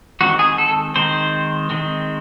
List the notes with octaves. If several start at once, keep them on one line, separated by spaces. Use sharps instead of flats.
D#3 G#3 C4 F#4
G#4
A4
D#3 G#3 C4 C5
D#3 G#3 C4